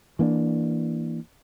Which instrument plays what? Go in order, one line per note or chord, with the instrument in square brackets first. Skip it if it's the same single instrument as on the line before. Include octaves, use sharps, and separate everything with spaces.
[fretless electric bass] E3 A#3 C4 D4